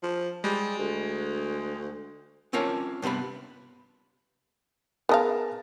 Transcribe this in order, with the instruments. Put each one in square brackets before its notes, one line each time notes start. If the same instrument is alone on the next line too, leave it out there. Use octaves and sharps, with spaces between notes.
[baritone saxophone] F3
[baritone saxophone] G3 [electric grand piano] G#3
[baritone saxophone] D2
[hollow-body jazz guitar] C4 C#4 F4 A#4 C#5 A5
G2 C3 B3 D4 B5
[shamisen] B3 D#5 F5 [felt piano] G#4 A#4 A5